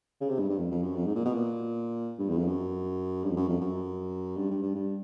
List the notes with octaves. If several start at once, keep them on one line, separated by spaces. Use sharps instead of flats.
C#3
C3
G2
G2
F2
F2
F#2
F2
G#2
A#2
B2
A#2
G2
E2
F2
F#2
G2
F2
F#2
F2
F#2
G2
G2
G2
G2